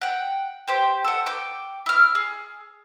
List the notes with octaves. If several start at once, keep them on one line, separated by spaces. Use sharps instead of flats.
F#5 G5
G4 C5 G5
A4 F#5
G5 D6
E4 F6
G#4